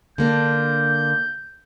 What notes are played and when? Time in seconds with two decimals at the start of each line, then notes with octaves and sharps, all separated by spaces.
0.18 D3 A#3 D4 G6